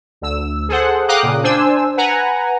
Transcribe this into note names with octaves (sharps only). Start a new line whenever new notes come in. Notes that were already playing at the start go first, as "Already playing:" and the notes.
D2 E6
G#4 A4 C5 F#5
F5 G5 A#5 D6 D#6 F#6
A#2 C#3
D4 C5 G#5 E6
B4 F#5 G#5 A#5